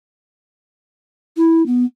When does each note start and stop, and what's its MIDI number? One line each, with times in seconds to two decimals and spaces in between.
1.37 1.65 64
1.66 1.84 59